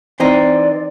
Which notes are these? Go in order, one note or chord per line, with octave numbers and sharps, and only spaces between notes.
E3 C4 D#4 D5